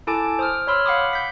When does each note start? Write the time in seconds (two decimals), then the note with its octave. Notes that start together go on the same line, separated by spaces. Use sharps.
0.07 E4 A4 G#5 A5 D6 D7
0.39 C5 D#6 F6
0.67 C#5 B5 C6 E6 F6
0.86 F5 F#5 B5 D6 D#6
1.13 G6 B6